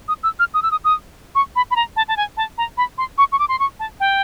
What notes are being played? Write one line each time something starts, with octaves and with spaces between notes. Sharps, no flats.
D#6
E6
F6
D#6
E6
D#6
D#6
C#6
B5
B5
A#5
A5
A5
G#5
A5
A#5
B5
C6
C#6
C#6
D6
C6
C#6
A5
G5